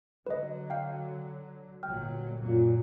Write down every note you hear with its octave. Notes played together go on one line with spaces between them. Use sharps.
D3 F#3 B4 D#5
F5 G5
G1 A#2 F#3 G5 F6
F#2 A#2 F#3 A#3